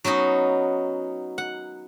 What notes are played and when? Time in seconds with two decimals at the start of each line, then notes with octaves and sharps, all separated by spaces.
0.05 F#3 B3 C#4 D#4
1.38 F#5